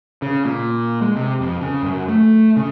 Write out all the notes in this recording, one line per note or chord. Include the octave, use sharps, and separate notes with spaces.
C#3
A#2
G#3
C3
F2
C#3
F#2
A3
C#3